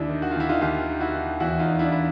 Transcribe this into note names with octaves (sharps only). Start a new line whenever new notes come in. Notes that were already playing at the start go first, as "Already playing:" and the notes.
Already playing: D#2 D4 E4
D#3
F#4
F4
D#2 E4
D#4 F4
D#2 F4 G4
D#3
E4 F#4
D#3
E2 E4 F#4
D#4 F4
E2
D4 E4
E4